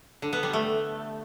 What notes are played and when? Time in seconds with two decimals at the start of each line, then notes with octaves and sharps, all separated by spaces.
0.22 D3
0.33 B3
0.43 G3
0.53 A3